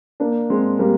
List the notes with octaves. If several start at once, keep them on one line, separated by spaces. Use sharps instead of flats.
A#3 D4
G#3 C4
G3 A#3